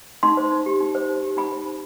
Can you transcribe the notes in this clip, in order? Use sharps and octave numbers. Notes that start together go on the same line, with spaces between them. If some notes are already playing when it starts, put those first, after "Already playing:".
D#4 C6
C5
D#4
G4
D#4
C5
D#4
G4
D#4 B5
C5
D#4